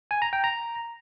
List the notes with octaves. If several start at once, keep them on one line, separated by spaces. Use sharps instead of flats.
G#5
A#5
G5
A#5